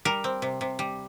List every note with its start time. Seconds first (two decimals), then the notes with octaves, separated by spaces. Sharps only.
0.05 G3 A#4
0.24 C4
0.42 C3
0.61 C3
0.79 G3